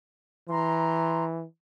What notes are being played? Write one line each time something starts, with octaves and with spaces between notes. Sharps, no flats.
E3 A#5 C6